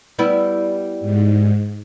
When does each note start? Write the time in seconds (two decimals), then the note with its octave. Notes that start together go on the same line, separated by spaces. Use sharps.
0.19 G3 B3 E4
1.00 G#2